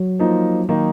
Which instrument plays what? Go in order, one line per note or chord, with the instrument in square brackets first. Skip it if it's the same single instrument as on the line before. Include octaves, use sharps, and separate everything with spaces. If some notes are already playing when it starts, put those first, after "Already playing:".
Already playing: [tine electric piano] F#3
[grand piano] F3 A#3 D#4
D#3 A#3 D#4